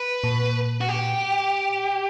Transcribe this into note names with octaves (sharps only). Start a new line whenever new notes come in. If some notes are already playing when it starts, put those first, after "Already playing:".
Already playing: B4
A#2
F#4
G4